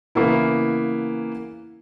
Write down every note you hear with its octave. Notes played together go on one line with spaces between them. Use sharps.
C#3 E3 A#3 B3 E4